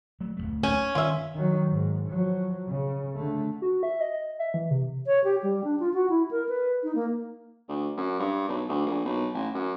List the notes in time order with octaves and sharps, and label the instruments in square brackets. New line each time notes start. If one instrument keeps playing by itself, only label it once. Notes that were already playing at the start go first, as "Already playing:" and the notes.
[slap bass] F#3 A3
D1 C2 A3
[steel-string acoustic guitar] C#4 [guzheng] G#5
[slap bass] G2 D#3 [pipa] F4 E5
[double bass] D#3 F#3
G#2
F3 F#3
C#3
D3 A3
[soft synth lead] F#4
E5
D#5
E5
E3
C3
[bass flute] C#5
G4
G3
D4
F4
F#4
E4
A#4
B4
D#4
A#3
[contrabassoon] D2
F#2
G2
B1
D2
A#1
B1
A1
F#2